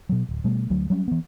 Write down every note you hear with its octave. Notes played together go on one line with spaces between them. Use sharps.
B2 F#3
D1
B2 G3 A3
D2 F#3
F#3 G3 C#4
E3 B3